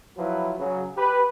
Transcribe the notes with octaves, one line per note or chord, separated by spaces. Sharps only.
F3 F#3 E4 F4 B4
C#3 F#3
G4 B4